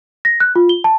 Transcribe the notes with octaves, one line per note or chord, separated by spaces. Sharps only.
A#6
F#6
F4
G7
A5